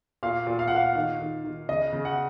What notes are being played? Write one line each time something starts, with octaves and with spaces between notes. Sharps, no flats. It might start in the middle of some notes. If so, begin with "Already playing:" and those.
A#2 F5
A#2
F5
F#5
A#2 F5
D#3 F5
D#3
D#3
C#3 D#5
C#3
F#5